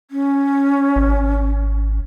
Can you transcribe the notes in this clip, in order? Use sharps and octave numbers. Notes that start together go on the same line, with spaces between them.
C#4
G#1